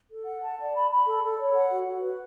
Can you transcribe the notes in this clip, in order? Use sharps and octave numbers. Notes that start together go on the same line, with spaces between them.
A4
F#5
A5
D5
B5
B5
A4
A4
C#5
F#5
F#4
F#4
B4